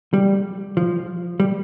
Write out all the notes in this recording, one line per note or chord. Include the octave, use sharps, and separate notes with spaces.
G3
F3
G3